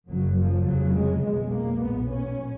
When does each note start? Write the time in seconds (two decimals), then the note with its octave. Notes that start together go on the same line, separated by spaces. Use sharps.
0.09 F#1 F#2 C#3 F#3
0.38 F3
0.66 F1 F2 C#3 F#3
0.96 G#3
1.24 B1 B2 G#3
1.53 A#3
1.82 B1 A#2 B3
2.11 C#4